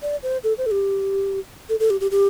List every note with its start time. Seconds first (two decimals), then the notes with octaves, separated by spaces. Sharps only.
0.02 D5
0.23 C5
0.44 A4
0.58 C5
0.66 A4
0.71 G4
1.69 A4
1.80 A4
1.90 G4
2.01 G4
2.11 G4